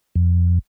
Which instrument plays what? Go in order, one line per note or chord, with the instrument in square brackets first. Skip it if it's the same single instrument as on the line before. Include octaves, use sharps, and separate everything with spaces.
[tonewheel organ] F2